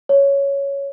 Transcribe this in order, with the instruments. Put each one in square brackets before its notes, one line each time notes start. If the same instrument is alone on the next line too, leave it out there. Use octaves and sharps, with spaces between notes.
[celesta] C#5